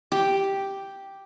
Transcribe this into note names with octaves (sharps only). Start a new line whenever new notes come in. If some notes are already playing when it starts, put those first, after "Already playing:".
G4